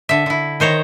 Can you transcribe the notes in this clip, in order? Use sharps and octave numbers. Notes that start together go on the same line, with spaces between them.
D3 E5
D3 E4
D#3 C5 C#5 A#5